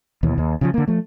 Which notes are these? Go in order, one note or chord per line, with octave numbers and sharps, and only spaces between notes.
D#2 B2 E3
D#2
C#3 E3 F3
D3 A#3
F3 A3